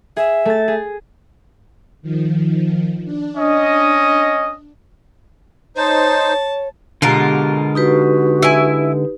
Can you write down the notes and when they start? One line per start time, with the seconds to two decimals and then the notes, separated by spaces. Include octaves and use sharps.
0.17 G#4 E5
0.45 A3 A6
0.68 G#4
2.02 D#3 F3
3.04 D4
3.36 C#4 D#5
5.77 D#4 C5 C#5 A5
7.02 B2 D3 G#3 F4 G4 A#4
7.75 D#4 F#4 G4 B4
8.42 E4 G#5